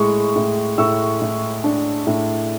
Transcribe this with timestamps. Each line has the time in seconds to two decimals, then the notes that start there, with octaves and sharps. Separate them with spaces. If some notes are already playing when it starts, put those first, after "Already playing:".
Already playing: A2 G#3 B5 C#6
0.36 A2
0.78 A2 C#6 E6
1.21 A2
1.64 D4
2.07 A2